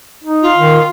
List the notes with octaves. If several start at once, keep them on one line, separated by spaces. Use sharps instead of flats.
D#4
F4
D#3